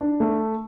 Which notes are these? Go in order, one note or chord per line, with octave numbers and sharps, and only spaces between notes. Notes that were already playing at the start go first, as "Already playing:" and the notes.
D4
A3